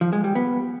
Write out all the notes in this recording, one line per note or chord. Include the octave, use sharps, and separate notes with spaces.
F3
G#3
G3
B3